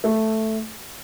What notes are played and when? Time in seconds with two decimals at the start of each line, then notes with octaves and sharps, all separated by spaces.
0.04 A3